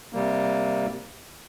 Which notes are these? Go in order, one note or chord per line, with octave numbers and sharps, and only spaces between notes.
C3 G3 A#3